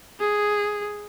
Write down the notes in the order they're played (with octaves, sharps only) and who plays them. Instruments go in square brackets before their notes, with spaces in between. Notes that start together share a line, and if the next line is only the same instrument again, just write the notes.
[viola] G#4